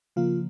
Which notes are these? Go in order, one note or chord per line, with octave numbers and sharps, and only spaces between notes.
C#3 F3 A#3 F4